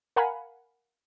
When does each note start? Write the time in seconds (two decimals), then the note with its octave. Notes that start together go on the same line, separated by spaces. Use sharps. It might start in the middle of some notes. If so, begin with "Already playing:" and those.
0.16 A#4 F5 F#5 G#5 A#5 B5